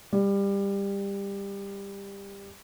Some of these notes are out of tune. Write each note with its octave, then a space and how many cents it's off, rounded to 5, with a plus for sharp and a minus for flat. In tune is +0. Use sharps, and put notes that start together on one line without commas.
G3 +20